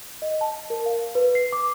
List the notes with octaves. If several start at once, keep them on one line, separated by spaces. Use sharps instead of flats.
D#5
A5
A#4
F5
B4
C7
D6